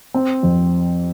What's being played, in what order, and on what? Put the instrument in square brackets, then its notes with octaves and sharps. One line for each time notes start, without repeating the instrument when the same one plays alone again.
[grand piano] C4
F2